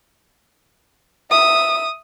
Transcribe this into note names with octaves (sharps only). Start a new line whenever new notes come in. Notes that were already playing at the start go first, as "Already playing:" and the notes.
E5 D#6